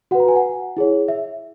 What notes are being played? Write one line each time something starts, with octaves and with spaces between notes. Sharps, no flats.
F#4 B4 F#5
A#5
G#5
F#5
E4 G#4 C#5
E5